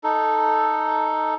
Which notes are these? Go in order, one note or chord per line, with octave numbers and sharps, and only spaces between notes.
D#4 A4